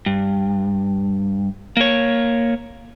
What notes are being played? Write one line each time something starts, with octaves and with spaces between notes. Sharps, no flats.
G2
A#3 C#5